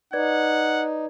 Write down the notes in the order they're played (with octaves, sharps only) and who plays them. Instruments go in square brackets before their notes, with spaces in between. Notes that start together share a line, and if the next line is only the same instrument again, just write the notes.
[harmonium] D#4 [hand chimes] B4 D5 G#6 [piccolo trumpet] F#5